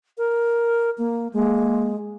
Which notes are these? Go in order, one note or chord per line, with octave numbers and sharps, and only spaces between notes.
A#4
A#3
G#3 A#3